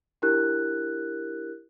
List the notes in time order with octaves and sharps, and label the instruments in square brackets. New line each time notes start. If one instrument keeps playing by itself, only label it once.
[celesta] D4 E4 G4 A#4 F#6